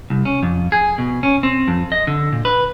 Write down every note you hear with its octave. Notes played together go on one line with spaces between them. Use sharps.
C2
C#4
F2
G#4
B2
C#4
C4
F2
D#5
D3
A#2
B4